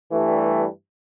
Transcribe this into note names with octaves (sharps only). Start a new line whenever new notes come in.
G2 E3 G3 A3